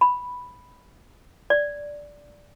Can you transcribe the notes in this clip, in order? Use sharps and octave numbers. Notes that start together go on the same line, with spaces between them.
B5
D5